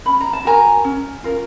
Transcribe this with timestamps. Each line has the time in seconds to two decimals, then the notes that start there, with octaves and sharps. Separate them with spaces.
0.06 C#4 B5
0.21 A#5
0.33 A5
0.45 F#4 A#4 G#5 A#5
0.84 C#4
1.24 F4 A#4